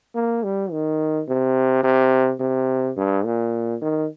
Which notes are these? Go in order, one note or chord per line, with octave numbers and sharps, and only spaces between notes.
A#3
G3
D#3
C3
C3
C3
G2
A#2
D#3